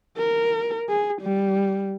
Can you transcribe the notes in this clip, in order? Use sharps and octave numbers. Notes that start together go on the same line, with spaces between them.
A#4
G#4
G3